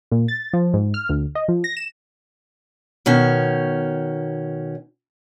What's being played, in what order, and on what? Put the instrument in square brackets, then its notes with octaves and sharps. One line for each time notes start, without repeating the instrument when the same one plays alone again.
[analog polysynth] A#2
A6
F3
G#2
F6
D2
D#5
F3
A#6
E7
[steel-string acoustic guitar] B2 D#3 C#4